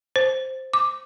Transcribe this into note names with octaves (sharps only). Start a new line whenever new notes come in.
C5
D6